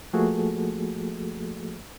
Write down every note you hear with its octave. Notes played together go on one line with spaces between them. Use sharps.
F3 A3 A#3 F#4 G#4 A4